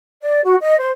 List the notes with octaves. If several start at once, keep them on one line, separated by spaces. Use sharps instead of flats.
D5
F#4
D#5
C5